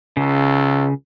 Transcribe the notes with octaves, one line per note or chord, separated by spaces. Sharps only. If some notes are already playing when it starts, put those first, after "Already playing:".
C#2 C#3